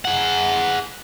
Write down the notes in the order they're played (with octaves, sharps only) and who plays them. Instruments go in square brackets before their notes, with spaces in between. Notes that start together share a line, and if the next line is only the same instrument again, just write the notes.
[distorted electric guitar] G#4 F#5